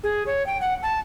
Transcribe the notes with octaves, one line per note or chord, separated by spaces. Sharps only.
G#4
C#5
G5
F#5
A5